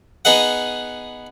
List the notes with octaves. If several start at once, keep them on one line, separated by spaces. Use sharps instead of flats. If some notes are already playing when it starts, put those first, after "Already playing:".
B3 D#4 G#4 D#5 F#5